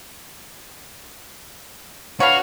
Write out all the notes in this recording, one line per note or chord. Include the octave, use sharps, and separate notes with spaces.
D4 F#4 B4 C#5 F5